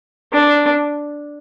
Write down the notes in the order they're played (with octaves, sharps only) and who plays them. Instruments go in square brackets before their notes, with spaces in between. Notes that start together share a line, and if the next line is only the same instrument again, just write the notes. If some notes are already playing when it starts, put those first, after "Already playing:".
[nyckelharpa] D4